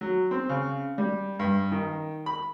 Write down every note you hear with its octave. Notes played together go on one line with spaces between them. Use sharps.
F#3
C4
C#3
G3
G2
D#3
B5